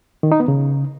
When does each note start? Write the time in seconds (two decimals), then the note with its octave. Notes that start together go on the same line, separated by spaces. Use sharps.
0.23 D#3
0.32 D#4
0.40 B3
0.48 C#3